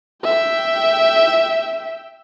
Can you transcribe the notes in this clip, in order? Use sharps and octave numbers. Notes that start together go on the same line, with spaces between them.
E5 G5